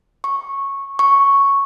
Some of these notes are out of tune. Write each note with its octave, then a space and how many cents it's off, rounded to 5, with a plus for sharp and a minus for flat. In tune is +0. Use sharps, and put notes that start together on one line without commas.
C#6 -10
C#6 +0